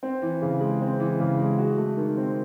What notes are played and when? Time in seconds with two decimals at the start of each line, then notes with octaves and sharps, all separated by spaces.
0.03 C4
0.22 E3
0.42 C#3
0.61 G#3
0.81 C4
1.00 E3
1.20 C#3
1.40 G#3
1.58 F#4
1.78 A3
1.97 D#3
2.17 C4